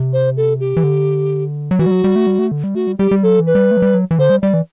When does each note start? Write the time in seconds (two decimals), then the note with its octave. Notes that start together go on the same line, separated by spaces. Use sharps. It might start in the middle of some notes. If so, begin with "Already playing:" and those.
Already playing: C3
0.13 C5
0.37 A4
0.60 G4
0.77 E3
0.84 D3
1.71 F#3
1.79 E3 F#4
1.86 G3
1.91 F#3
2.04 G3
2.16 A3
2.27 G3
2.39 A3
2.52 D3
2.64 G3
2.75 A3 F#4
2.87 G3
2.98 G3 G4
3.11 G3
3.23 F#3 A4
3.39 E3
3.47 B4
3.55 G3
3.71 A3
3.77 F#3
3.82 G3
3.94 F#3
4.11 E3
4.19 D3 C5
4.30 G3
4.42 G3 D5
4.54 E3